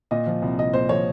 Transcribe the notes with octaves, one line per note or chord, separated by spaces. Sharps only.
A#2 D#5
F3
C2
C2 D#5
A#2 C5
F3 C#5